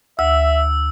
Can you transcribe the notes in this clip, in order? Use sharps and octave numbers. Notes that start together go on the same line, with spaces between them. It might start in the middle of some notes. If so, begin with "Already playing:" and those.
D2 E5 E6